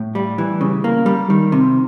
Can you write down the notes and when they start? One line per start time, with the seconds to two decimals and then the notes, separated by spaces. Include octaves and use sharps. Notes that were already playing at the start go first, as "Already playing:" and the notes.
Already playing: A2
0.15 G3
0.38 E3
0.61 C#3
0.84 A#3
1.06 G3
1.30 D#3
1.52 C3